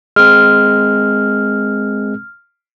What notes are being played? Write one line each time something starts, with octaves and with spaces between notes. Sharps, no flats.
G#3 C4 F6